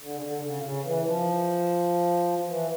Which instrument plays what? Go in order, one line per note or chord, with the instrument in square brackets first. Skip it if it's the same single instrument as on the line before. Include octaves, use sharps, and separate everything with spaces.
[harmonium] D3
C#3
D3
C#3
A#2
C#3
E3
F3
E3